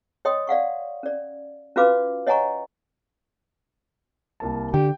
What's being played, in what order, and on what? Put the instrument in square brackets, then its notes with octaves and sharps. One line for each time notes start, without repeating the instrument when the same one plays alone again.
[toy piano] C#5 D#5 G5 C6 D#6
D5 F5 F#5 C#6
C#4 D5
C#4 F4 F#4 B4 F5 D6
C#5 D#5 F#5 G#5 A#5 C#6
[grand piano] C2 A#3 A5
[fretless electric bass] D3 [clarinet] G4 [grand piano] G5